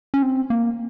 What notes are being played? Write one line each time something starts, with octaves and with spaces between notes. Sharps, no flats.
C#4
C4
A#3